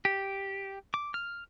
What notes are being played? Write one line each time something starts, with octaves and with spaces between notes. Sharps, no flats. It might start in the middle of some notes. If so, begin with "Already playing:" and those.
G4
D6
F6